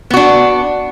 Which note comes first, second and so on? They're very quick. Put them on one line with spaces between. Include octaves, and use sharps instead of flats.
B3 F#4 D4